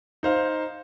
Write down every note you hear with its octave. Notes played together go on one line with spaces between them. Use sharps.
D#4 C5 F5